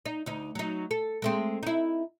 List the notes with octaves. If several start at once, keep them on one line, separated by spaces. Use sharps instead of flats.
D#4
D2 D#4
F#3 D#4
A4
G#3 A3 C4
D#4 E4